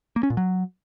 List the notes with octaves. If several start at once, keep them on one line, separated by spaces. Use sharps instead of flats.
A#3
C#4
A#2
F#3